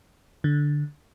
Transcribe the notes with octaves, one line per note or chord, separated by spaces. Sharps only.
D3